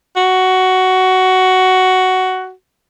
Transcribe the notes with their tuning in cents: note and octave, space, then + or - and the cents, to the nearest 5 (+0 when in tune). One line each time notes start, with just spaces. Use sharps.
F#4 +10